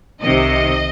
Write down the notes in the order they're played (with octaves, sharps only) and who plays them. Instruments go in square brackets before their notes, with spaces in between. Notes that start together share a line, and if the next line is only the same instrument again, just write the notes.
[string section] C2 C3 D#3 D#5